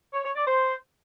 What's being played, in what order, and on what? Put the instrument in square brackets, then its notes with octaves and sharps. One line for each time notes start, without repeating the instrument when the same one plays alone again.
[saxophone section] C#5
C#5
D5
C5